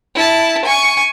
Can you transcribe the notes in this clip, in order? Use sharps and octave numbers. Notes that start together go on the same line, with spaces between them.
E4 A5
G#5 C#6